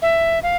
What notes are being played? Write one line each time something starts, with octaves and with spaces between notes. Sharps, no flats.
E5
F5